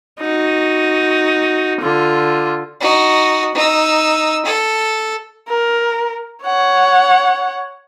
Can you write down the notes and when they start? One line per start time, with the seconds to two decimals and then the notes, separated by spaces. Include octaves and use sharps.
0.20 D#4 F#4
1.81 D3 F4
2.81 D#4 F#4
3.55 D#4 E6
4.45 A4
5.48 A#4
6.43 C#5 F#5